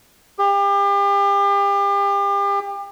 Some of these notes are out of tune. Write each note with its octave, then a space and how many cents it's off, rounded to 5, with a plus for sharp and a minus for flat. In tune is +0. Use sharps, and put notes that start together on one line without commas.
G4 +35